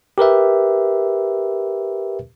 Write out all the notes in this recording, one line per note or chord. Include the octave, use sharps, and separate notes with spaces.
G4 A#4 B4 E5